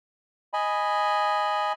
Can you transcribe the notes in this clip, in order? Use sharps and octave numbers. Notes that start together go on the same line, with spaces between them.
D#5 G#5 B5